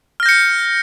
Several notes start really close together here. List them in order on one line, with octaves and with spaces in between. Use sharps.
F6 A#6 G6 C#7